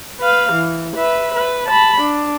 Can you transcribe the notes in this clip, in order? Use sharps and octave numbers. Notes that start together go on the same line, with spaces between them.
B4 F5
E3
B4 E5
B4
A5 B5
D4